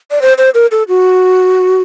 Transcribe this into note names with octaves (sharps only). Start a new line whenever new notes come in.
D5
C5
C5
A#4
A4
F#4